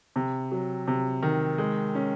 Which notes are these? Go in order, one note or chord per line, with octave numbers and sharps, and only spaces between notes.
C3
F#3
C3
D#3
G#3
C#4